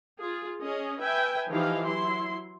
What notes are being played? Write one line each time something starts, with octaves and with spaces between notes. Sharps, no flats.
F4 G#4
C#4 G#4 D#5
B4 E5 G5 G#5
E3 F3 D#4 G4 F5
F#3 E4 C6